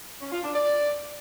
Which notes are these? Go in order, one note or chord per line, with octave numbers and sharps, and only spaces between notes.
C#4
F4
D4
D5